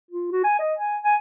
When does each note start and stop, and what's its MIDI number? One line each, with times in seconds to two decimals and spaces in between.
0.11 0.31 65
0.32 0.39 66
0.44 0.56 80
0.59 0.73 75
0.78 0.98 80
1.04 1.15 80